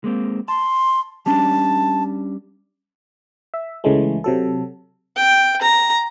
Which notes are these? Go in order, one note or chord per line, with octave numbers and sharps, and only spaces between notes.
G#3 A#3 C4
A5 C6
G3 C#4 D4 A5
E5
C#2 C#3 E3 G#3 A3
C3 F#3 A4
G5
A#5